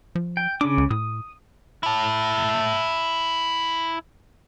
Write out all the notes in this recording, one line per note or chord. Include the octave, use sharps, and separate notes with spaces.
F3
G5
C#3 D4 D6
C#2
A2 D#6
E4 A5